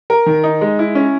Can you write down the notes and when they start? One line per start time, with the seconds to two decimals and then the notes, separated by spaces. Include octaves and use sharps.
0.10 A#4
0.26 D#3
0.44 D#4
0.61 G#3
0.79 E4
0.95 C#4